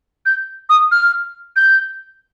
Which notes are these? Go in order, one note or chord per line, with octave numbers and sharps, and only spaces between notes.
G6
D#6
F6
G6